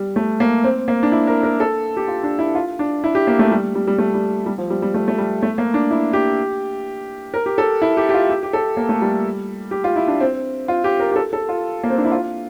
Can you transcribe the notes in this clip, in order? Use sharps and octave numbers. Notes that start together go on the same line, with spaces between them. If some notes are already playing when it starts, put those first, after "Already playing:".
Already playing: G3
A3
A#3
C4
A#3
D4
E4
A#4
A#4
A4
G4
F4
D4
E4
F4
D4
E4
G4
A#3
A3
G3
G3
G3
A3
G3
G3
F3
G3
G3
A3
A3
G3
A3
A#3
D4
E4
G4
A#4
G4
A4
E4
G4
G4
F4
G4
G4
A4
A#3
A3
G3
G4
F4
E4
D4
C4
F4
G4
A#4
G4
A4
A4
F4
A#3
C4
D4
E4
F4